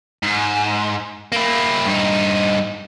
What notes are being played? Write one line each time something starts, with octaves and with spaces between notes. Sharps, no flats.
G#2
A#3 E4
G2 D#4